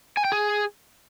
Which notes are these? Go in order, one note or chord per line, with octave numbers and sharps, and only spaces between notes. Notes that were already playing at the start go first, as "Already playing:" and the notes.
G#5
G5
G#4